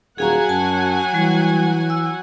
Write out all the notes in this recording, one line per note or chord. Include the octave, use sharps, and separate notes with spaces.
D#1 F#3 G#4 F5 F#5 G#5 A#5
F#2 A5
E3 G3
E6